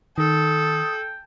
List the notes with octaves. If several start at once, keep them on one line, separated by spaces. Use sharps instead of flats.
D#3 A4 G5 D#6